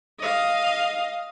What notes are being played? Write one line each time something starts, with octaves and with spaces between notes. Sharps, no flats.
D#5 F5